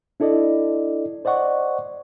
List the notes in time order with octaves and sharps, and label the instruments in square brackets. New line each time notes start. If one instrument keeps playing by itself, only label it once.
[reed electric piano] D4 E4 A4 D5 D#5
C5 D5 D#5 F#5 C#6